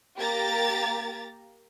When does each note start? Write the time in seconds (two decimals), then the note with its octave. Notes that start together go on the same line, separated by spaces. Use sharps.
0.17 A#3 G4 A#5 A6